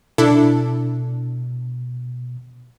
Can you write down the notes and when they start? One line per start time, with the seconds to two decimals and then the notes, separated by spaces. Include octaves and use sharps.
0.18 B2 D4 E4 A4